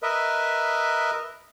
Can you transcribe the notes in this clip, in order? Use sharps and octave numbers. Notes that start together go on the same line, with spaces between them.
A#4 B4 D#5 E5